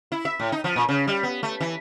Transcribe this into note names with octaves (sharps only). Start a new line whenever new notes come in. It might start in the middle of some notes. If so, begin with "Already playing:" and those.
E4
E5
A2
D#4
F3
A#2
C#3
G3
B3
A3
E3